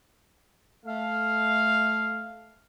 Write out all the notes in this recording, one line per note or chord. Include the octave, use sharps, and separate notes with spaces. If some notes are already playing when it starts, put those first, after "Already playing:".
A3 F5